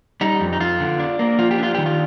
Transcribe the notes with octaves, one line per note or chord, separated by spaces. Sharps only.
G3 D#4
F2
D#4
F2 F4
D3
D4
A#3
F3 F4
G4
D4 F4
D#3 G4
F4